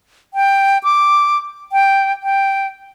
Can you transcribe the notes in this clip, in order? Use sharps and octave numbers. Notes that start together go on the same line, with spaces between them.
G5
D6
G5
G5